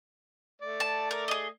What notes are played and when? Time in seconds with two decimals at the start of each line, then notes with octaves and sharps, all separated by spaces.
0.62 A3 D5
0.80 A5
1.11 A#4
1.28 G#4 D#5